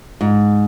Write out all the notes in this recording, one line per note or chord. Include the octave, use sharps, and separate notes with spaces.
G#2